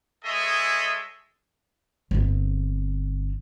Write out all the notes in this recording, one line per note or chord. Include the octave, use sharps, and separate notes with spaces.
G#3 G#4 A4 C#5 D#5 E5
G1 C4